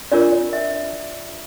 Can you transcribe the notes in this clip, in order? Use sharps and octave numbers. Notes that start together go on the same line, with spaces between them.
D4 F4 A#4 D5
D5
E5